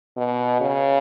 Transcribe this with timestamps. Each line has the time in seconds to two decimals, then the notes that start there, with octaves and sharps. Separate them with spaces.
0.17 B2
0.61 C#3